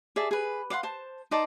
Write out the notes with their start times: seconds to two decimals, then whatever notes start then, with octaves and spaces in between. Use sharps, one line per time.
0.16 G#4 D5 E5 A5
0.31 G#4 B4
0.70 D5 F5 F#5 C6
0.83 C5 A5
1.31 D#4 C5 D5 A5